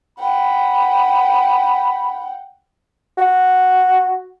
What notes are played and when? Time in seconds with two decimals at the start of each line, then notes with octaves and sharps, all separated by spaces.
0.19 F#5 G5 B5
3.18 F#4